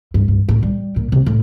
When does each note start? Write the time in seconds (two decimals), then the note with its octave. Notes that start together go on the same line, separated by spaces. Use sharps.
0.14 G2
0.28 G2
0.49 A2
0.63 G3
0.96 A#2
1.12 C3
1.26 A2